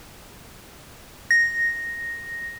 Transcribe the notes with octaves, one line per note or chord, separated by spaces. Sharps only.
A#6